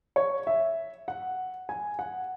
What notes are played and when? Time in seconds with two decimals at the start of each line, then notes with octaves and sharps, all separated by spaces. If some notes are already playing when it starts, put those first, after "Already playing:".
0.16 C#5
0.47 E5
1.08 F#5
1.69 G#5
1.99 F#5